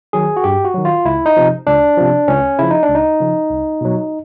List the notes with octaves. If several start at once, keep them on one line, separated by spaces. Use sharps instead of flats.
D#3 F#3 G#4
F#4
G2 G4
F#4
D#3 F#3
F4
C#2 E4
D#4
C3 F3
C#2 D4
C3 F3
C#2 C#4
C#3 F3 E4
D#4
D4
C#2
D#4
C#3 F3
C2
B2 F#3